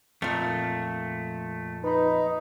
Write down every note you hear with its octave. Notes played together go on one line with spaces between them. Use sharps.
F2 A#2 A3
D#4 B4 B5